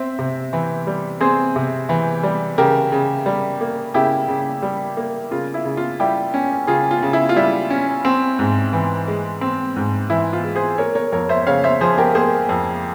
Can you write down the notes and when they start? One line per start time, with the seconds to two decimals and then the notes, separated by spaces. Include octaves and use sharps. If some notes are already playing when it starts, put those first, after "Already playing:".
Already playing: C4 C5 E5
0.19 C3
0.53 E3
0.87 G3
1.21 C4 G#4 C5
1.56 C3
1.89 E3
2.23 G3
2.58 C#3 G4 A#4
2.92 C#3
3.26 G3
3.61 A#3
3.94 C#3 E4 G4
4.28 C#3
4.62 G3
4.97 A#3
5.31 C#3 F4
5.54 E4
5.65 C#3
5.77 F4
6.00 G3 E4 G4
6.34 C#4
6.67 C#3 F4 G#4
6.91 F4
7.03 C#3
7.13 E4
7.29 F4
7.36 G3 E4
7.70 C#4
8.05 C4
8.39 G#2
8.73 E3
9.08 G#3
9.41 C4
9.76 G#2
10.10 E3 E4
10.33 F4
10.44 G#3
10.56 G#4 C5
10.78 A#3 A#4 C#5
10.95 A#4 C#5
11.12 F2 A#4 C#5
11.29 C5 E5
11.47 C#3 C#5 F5
11.64 C5 E5
11.81 F3 G#4 C5
11.98 G4 A#4
12.15 A#3 G#4 C5
12.49 F2